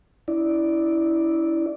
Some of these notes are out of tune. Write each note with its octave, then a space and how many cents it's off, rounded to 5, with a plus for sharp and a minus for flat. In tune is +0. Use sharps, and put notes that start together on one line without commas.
C#4 +35 E4 -10 D5 +0